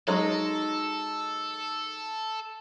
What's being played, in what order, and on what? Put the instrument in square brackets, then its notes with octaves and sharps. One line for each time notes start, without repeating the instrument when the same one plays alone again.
[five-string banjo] F#3 G#3 D#4 [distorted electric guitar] A4